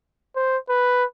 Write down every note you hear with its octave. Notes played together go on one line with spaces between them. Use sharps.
C5
B4